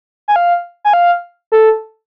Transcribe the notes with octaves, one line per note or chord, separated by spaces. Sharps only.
G#5
F5
G#5
F5
A4